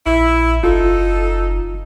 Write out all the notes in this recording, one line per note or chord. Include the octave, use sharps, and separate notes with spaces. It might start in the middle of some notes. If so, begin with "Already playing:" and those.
A#1 E4
F#1 D#4 F4 A4